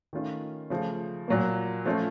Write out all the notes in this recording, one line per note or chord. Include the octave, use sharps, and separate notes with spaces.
D#3 A3 C#4 F4
C#3 F3 A3
A#2 F#3 A#3
F3 A3 C#4 F4